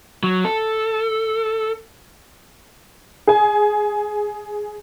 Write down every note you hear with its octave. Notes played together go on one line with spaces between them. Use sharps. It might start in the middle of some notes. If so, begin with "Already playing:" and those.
F#3
A4
G#4 G#5